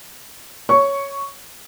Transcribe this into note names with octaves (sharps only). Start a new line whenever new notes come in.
C#5 C#6